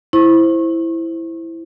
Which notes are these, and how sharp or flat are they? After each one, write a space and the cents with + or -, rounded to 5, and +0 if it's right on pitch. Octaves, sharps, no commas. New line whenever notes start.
E4 +5 C5 +0 C#6 -30